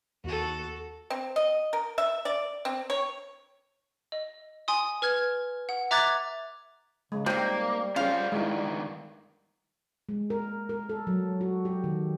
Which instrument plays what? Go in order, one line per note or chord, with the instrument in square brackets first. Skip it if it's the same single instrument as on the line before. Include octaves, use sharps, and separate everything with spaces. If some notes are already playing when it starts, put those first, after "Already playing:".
[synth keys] D#2 [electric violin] F#4 A4
[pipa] C4
D#5
A#4
E5
D5
C4
C#5
[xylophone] D#5
G#5 C6 D#6
B4 F6 G#6
F#5
E5 A#5 D6 F#6 G#6 A6
[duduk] C#3 [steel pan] G#3
[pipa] C3 D#3 [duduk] G3 [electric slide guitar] A#3
[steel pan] C#4 G#4 [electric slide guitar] F4 G4 C5 [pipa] F5
[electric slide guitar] G2 D#3 [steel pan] G#3 E4
[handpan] G#3
A#4
A#4
A4
F#3
F#4
G4
D#3